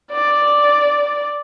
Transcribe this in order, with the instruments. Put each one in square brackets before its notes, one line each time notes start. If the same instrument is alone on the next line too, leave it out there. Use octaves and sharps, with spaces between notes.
[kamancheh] D5